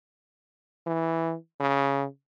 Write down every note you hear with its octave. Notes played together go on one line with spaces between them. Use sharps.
E3
C#3